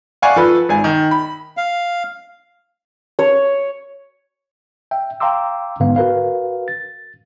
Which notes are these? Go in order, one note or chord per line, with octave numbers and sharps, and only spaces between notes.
D5 F5 F#5 G#5 C#6
F3 A4 B4
G#1 G#5
D#3
B5
F5
C#5
E5 G5
F5 G5 A#5 C6 D6 E6
G#2 D3 B3 F5
F#4 A#4 B4 F5
A6